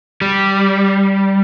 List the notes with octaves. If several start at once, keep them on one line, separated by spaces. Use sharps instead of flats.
G3